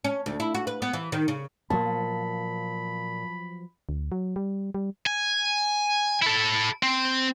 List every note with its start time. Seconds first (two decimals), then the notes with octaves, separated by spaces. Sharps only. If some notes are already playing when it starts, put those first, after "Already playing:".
0.04 C#4
0.26 D2
0.40 E4
0.55 F#4
0.67 B4
0.82 B3
0.93 E3
1.12 D#3
1.28 C#3
1.70 A#2 F3 F#3 B3 A5 B5
3.89 D2
4.12 F#3
4.36 G3
4.74 G3
5.06 G#5
6.22 E4 A4
6.83 C4